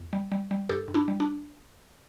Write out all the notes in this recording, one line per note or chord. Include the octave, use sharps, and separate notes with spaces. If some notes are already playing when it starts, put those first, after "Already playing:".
Already playing: E2
G3
G3
G3
G2 G4 A4
G2
D4 E4
G3
D4